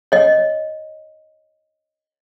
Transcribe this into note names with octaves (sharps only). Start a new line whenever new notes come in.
C#5 D#5